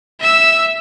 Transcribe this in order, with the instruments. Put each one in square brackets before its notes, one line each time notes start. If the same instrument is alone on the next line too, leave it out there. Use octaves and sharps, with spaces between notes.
[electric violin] E5 E6